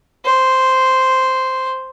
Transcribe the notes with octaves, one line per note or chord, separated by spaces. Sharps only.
C5